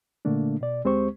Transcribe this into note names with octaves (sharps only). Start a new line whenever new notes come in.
A#2 D3 A3 A#3 D4
B2 D5
D2 G#3 C4 G4 C5 C#6